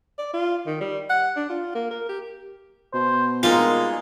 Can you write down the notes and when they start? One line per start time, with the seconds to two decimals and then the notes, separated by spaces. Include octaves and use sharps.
0.18 D5
0.34 F4
0.67 D#3
0.81 G3
1.10 F#5
1.36 D4
1.50 F4
1.75 A#3
1.91 A#4
2.09 G4
2.94 B2 C5
3.43 G3 G#3 A#3 D#4 F4